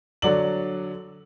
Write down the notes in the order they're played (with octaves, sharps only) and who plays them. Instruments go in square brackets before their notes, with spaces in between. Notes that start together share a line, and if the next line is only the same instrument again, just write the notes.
[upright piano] D3 F#3 D5 F#7